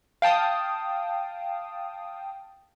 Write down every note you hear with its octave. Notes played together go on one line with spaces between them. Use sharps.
F5 G5 A5 D#6